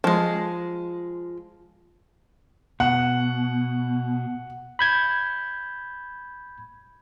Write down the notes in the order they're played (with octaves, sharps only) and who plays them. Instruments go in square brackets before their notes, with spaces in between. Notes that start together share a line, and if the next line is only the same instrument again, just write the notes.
[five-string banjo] F3 G#3
[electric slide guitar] B2 [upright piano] F#5
[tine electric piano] B5 G6 G#6